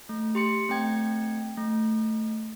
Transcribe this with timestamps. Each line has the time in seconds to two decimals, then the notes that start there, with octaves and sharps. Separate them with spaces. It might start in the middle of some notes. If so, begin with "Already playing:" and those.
0.09 A3
0.35 G4 C6 C#7
0.69 A3 C4 G5 G#6
1.57 A3